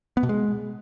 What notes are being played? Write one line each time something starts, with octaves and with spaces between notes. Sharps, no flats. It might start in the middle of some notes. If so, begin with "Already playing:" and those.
B3
B2
G#3